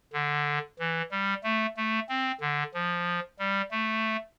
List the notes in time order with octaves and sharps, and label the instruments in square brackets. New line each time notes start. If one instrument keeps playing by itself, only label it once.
[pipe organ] D3
E3
G3
A3
A3
C4
D3
F3
G3
A3